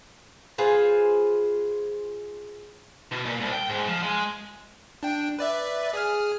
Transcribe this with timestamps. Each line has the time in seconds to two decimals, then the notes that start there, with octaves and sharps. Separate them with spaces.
0.58 F4 G#4 B4 C5
3.12 B2
3.25 A#2
3.40 C2
3.52 G5
3.69 G#2
3.87 F3
4.03 G#3
5.03 D4 G5
5.39 B4 D5 E5
5.93 G#4 G#5 F6